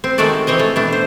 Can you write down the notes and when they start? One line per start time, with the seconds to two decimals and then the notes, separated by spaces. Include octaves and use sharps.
0.04 C4
0.18 D#3 G#3 A3 F#4 A4 D5
0.47 E3 C4 C#5 D#5
0.59 A3
0.76 B2 A3 D4
0.93 C5